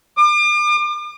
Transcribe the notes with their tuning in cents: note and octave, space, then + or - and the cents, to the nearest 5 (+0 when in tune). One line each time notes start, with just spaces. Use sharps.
D6 +40